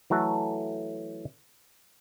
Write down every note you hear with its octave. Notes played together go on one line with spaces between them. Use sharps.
E3 F#3 A3 F#4 A4